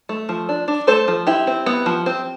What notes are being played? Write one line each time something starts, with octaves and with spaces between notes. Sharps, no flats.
A3
F3
D4
D4
A3 A4 C5
F3
C4 E4 G4
C4
B3
F3
C4